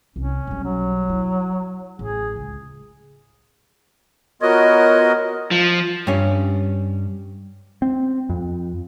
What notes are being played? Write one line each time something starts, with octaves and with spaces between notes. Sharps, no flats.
C2 C#4
B1 G3
F#3
E4
A1 G#4
C#2
B3 F4 F#4 A#4 C#5 D#5
F3
G2 C#4
C4
F2